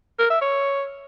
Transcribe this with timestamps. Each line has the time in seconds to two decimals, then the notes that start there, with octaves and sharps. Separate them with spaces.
0.19 A#4
0.30 E5
0.41 C#5